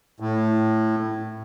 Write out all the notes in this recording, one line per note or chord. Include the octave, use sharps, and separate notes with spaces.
A2